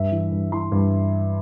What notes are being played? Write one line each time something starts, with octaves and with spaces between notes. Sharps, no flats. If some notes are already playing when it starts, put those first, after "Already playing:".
Already playing: G2 E5
E3
G2
E3 C6
G2